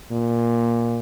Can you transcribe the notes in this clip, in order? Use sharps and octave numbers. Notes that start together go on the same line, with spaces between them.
A#2